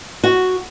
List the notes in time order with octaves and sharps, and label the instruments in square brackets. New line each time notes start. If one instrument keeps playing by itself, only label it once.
[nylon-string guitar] F#4